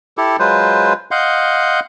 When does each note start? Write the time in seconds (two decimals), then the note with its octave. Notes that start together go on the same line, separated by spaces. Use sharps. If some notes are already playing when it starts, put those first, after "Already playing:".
0.18 E4 G4 A4
0.39 F#3 G#3 F4 B4 C5
1.11 D#5 F5 F#5 C6 G6